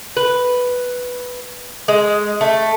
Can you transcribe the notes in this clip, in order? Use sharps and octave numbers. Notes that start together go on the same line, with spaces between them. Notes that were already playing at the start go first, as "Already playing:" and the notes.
B4
G#3
A3